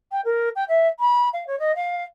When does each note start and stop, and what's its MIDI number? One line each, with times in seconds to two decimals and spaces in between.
0.12 0.21 79
0.25 0.49 70
0.56 0.64 79
0.69 0.88 76
1.00 1.29 83
1.33 1.44 77
1.47 1.58 73
1.59 1.75 75
1.76 2.04 77